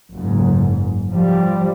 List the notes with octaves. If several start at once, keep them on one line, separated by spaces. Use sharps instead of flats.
F#1 G#2
F3 G3